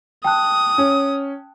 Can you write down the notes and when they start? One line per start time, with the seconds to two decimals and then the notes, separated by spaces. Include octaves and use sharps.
0.24 G5 A5 D#6 F#6
0.78 C#4